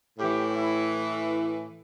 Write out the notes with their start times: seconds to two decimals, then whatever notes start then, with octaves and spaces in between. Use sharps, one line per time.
0.18 A2 E3 G4
0.55 E4